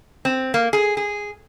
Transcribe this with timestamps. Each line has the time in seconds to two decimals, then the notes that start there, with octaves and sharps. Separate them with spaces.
0.25 C4
0.54 A#3
0.73 G#4
0.97 G#4